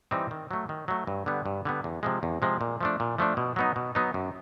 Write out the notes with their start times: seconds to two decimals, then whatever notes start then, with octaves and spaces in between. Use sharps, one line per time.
0.11 E3 G3 C4 D#4
0.31 D#3
0.51 F#3 A3
0.69 D#3
0.88 F#3 A3
1.07 G2
1.26 D3 G3 B3
1.46 G2
1.65 D3 G3 B3
1.84 E2
2.03 C3 F3 G#3
2.23 E2
2.42 C3 F3 G#3
2.61 A#2
2.81 F3 A3 D4
3.00 A#2
3.18 F3 A3 D4
3.37 B2
3.56 F#3 B3 D#4
3.76 B2
3.95 F#3 B3 D#4
4.14 F#2